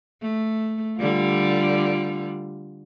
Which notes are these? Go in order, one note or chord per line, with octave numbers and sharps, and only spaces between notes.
A3
D3 G3 F4